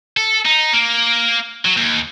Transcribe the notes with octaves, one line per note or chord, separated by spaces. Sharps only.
A4
D#4
A#3
F#3
D#2